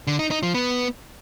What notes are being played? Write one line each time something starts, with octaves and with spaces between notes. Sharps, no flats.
D3
D#4
D#4
F3
B3